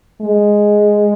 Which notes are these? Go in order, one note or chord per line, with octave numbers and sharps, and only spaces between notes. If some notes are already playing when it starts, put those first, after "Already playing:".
G#3